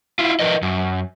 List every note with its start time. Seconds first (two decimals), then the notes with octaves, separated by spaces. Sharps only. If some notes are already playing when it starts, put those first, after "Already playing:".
0.19 E4 F4
0.40 F3 A#4 B4 D#5
0.63 F#2